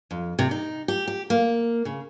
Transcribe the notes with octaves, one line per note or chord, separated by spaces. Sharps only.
F2
C3
D#4
G4
G4
A#3
C#3